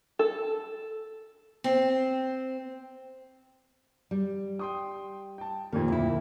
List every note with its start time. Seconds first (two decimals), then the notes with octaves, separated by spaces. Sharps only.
0.19 A4
1.64 C4
4.11 G3
4.59 G5 C6 D#6
5.38 G5 A5
5.73 F2 A#2 D#3 A#3
5.88 D2 E4